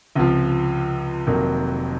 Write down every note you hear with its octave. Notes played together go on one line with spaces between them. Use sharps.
C#2 C3 F3
F1 F2 D#3 F#3 A#3